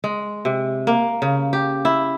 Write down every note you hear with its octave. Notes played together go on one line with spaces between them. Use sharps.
G#3
C3
A#3
C#3
G4
E4